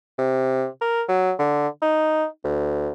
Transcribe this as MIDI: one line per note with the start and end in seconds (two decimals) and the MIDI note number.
0.18 0.66 48
0.81 1.02 70
1.08 1.33 54
1.39 1.68 50
1.82 2.26 63
2.44 2.91 38